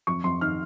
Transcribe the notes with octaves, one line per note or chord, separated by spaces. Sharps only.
F2 C#6
F2 C6
D#3 F6